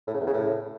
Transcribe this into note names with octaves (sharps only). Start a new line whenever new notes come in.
A2
C#3
E2
C#3
A2